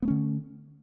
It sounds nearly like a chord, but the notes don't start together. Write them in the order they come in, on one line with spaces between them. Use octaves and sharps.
B3 A3 C#4 D3